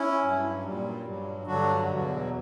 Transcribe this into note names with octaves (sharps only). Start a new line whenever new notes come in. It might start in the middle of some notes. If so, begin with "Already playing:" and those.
Already playing: C#4 E4
G2 F#3
A#2 G3
G2 F#3
G2 D3 F#3 D4 F#4
E2 B2 F#3